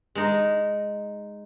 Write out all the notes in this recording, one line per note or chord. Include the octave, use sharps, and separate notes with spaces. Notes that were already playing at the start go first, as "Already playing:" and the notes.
G#3 D#4